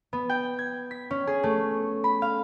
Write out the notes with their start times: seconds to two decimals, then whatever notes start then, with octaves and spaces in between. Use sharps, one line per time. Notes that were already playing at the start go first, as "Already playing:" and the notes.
0.13 B3
0.29 G5
0.59 G#6
0.91 B6
1.11 C#4
1.27 G#4
1.43 A3
2.04 B5
2.22 F5